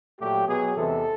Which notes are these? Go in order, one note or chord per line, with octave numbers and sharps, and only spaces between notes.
A#2 F#3 A3 G4
B2 F#3 B3 G#4
E2 C3 E3 G#3 B3 A4